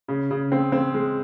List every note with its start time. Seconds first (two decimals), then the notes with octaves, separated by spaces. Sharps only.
0.08 C#3
0.31 C#3
0.52 C4
0.72 C4
0.94 G#3